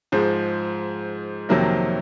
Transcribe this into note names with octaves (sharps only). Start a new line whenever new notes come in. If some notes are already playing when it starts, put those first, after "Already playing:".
G#2 F3 G#3
F2 C3 D#3 F#3 A#3